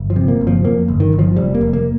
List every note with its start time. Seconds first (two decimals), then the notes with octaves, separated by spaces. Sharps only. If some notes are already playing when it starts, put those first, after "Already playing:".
Already playing: G1
0.10 F3
0.16 C3
0.28 A#3
0.41 G1
0.47 F3
0.64 F2 A#3
0.88 G1
1.00 D#3
1.13 G1
1.19 F3
1.36 F1 G3
1.55 A#3
1.61 F1
1.73 A#3